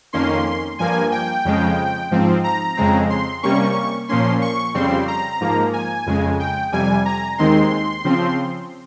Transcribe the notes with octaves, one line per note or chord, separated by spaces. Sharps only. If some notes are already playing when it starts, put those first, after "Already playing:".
F2 D#3 A#3 C#4 C6
G2 F3 A#3 G#5
G5
F2 C#3 F3 G#3
G#2 F3 C4
A#5
F2 C#3 G#3 C4
C6
C3 G3 A#3 C#4 C#6
A#2 F3 A#3 C#4 C6
C#6
F2 C#3 G3 C4 C6
A#5
G#2 F3 A#3
G#5
F2 C#3 G#3
G5
F2 C3 G3 G#5
A#5
D#2 D#3 G#3 C4 C6
C#3 F3 C4